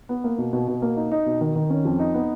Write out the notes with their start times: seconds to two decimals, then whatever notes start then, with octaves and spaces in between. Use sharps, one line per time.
0.09 B3
0.24 A#3
0.38 B2
0.53 B2
0.68 B2
0.82 A#3
0.97 D#4
1.11 D#4
1.26 B2
1.41 D#3
1.56 D#3
1.70 C#4
1.85 F2
1.99 D#4
2.14 B3